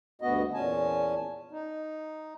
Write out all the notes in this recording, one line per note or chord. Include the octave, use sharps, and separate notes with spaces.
D2 G2 B3 F#4 D#5
E2 A#2 C#4 G#5 A5
D#4